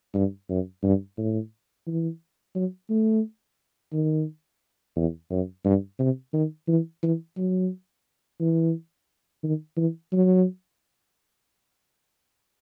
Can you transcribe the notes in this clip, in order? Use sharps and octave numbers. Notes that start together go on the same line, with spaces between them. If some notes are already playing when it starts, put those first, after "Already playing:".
G2
F#2
G2
A2
E3
F#3
A3
D#3
E2
F#2
G2
C3
D#3
E3
E3
F#3
E3
D#3
E3
F#3